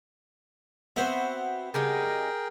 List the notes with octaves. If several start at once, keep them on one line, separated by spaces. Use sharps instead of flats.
B3 C4 F#4 C5 E5
C#3 G3 D#4 G#4 A#4 G5